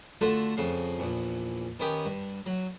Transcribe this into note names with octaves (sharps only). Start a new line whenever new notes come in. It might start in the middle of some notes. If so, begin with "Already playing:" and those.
D3 A3 F4 F#4 A4
F2 C#3 F5
A#1 E2
D#3 B3 C#4 G4
G2
F#3